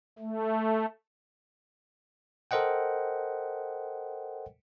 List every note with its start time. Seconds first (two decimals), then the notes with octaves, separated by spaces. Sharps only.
0.19 A3
2.51 A4 A#4 C5 D#5 F#5 G5